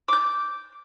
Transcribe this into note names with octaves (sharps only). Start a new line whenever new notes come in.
D6 G6